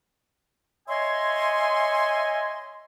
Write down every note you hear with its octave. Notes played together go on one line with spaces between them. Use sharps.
C#5 D#5 E5 G#5 C6